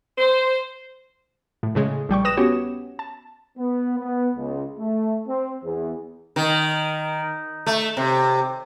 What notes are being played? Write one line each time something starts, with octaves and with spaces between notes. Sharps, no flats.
C5
A2
A2 C#3 G#3
A#1 G3 G5 C#6
B4 D#6 A#6 E7
B3 C#4 F#4 G4 C#5
A5
B3
B3
C#2
A3
C4
E2
D#3
A3
C3